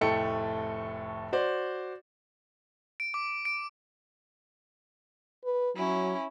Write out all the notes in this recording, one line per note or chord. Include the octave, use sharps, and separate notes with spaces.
F1 A2 A3 A4 G5 C#7
F#4 C5 D5
D7
D6
D7
B4
F#3 C#4 E4